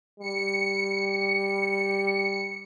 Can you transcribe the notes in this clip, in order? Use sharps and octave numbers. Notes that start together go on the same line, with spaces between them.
G3 C#7